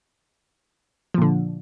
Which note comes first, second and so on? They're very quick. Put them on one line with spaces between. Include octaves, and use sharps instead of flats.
F3 A#2 D3